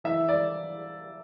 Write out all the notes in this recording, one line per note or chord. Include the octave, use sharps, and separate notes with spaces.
E3 E5
D5